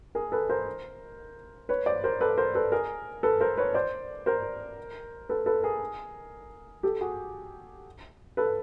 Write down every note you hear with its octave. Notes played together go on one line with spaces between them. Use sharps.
G#4 A#4
A4 B4
A#4 C5
B4 C#5
C5 D5
A#4 C5
A4 B4
A#4 C5
A4 B4
G#4 A#4
A4 B4
A#4 C5
B4 C#5
C5 D5
A#4 C5
A4 B4
A4 B4
G#4 A#4
G4 A4
F#4 G#4
A4 B4